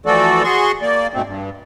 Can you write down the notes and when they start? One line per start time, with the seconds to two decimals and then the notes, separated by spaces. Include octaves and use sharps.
0.06 E3 F3 A3 F#4 A4 D5
0.44 F#4 G#4 C6 C#6
0.82 A#3 D5
1.14 G#2 B2 A3 C4
1.26 G2